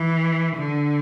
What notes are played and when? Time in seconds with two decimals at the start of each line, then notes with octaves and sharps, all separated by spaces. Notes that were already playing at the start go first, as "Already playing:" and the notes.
Already playing: E3
0.56 D3